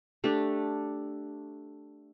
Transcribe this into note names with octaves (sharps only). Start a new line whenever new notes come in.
A3 D4 G4